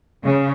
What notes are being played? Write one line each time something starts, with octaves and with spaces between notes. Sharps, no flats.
C#3